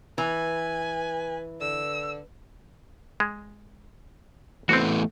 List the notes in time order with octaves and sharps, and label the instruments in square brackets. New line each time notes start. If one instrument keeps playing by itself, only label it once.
[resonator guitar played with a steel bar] E3 [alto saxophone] B4 [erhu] G#5
[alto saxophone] D3 [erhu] E6
[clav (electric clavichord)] G#3
[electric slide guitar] E3 A3 B3 [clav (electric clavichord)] C4 F#4